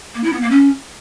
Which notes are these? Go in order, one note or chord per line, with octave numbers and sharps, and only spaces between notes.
A#3
E4
B3
A#3
C#4